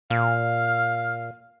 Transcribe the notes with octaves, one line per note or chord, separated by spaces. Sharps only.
A#2 F5 F6